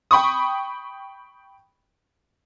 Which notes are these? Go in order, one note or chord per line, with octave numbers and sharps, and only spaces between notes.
G5 B5 C#6 D#6